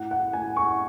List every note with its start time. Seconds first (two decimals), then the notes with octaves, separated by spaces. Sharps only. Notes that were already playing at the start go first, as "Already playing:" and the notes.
Already playing: A2 F#5
0.11 F#5
0.33 A2 G#5
0.56 C#6